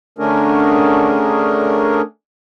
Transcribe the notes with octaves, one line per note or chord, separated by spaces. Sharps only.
D3 A3 C#4 D4 G#4 A#4